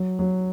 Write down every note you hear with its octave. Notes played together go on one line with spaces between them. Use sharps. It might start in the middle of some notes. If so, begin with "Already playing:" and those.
Already playing: F#3
F#3